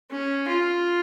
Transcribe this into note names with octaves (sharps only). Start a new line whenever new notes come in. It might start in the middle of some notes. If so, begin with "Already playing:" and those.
C#4
F4